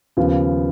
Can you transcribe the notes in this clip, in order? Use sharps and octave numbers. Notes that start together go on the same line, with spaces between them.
D#2 C#3 F3 B3